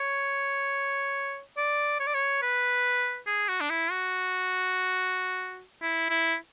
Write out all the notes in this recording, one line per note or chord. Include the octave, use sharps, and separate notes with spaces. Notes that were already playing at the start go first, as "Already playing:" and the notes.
Already playing: C#5
D5
C#5
D5
C#5
B4
G#4
F#4
D4
E4
F#4
E4
E4